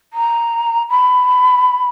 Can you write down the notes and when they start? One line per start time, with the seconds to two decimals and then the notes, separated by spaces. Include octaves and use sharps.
0.13 A#5
0.90 B5